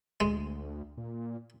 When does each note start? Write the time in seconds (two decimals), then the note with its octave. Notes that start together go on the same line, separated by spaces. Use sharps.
0.20 D2 G#3
0.97 A#2